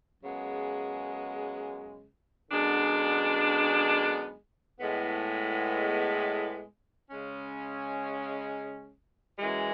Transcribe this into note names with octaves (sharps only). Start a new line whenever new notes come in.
F#2 C#3 G#3 B3
F#2 D3 G#3 B3 D4
A2 G#3 B3
C#3 G#3 C#4
F#2 E3 G#3